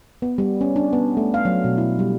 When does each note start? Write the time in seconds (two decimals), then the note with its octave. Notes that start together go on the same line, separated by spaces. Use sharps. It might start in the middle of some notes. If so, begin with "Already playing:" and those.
0.22 B3
0.38 G3
0.61 C#4
0.76 D4
0.93 B3
1.17 A3
1.34 F5
1.45 F#3
1.64 B2
1.78 E4
1.99 G3